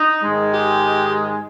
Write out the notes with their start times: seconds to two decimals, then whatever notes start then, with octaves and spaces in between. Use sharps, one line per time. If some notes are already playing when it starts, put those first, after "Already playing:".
Already playing: D#4
0.23 G#2 D#3 G#3
0.52 G4